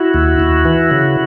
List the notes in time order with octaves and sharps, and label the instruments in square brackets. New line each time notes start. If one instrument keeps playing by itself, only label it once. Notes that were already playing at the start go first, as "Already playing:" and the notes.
Already playing: [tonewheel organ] E4 F#4
D#2
D#2
E3
C#3